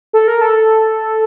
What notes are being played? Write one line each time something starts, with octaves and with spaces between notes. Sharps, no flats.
A4
A#4
A4